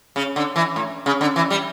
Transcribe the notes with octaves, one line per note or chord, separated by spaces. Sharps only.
C#3
D3
E3
A2
C#3
D3
E3
G3